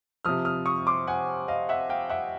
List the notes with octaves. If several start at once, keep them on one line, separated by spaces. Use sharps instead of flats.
C3 F3 D#6 F6
D#6 F6
C#6 D#6
C6 D6
F#5 G#5
D#5 F5
E5 F#5
F5 G5
E5 F#5